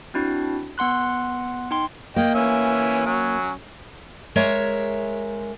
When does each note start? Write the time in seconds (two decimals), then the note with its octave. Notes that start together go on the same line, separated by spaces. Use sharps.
0.14 C4 D4 E4 F#4
0.78 B3 F#5 C6 F#6
1.71 D#4 G5 C6
2.16 A#3 D#5 G5
2.34 E3 C#4 E5
3.06 F#3 C#4
4.36 G#3 A#4 C#5 E5